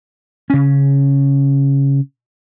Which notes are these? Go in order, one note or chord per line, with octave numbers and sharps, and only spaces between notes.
C#3 C#4